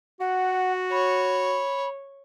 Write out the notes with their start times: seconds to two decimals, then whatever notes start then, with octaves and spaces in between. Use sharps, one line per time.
0.20 F#4 F#5
0.92 C#5 B5